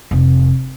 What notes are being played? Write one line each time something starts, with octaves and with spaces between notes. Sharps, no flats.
F1